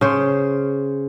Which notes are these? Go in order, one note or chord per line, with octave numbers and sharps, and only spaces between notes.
C#3 C5